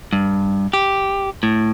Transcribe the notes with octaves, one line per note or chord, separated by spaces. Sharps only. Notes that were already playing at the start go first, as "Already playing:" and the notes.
G2
G4
A2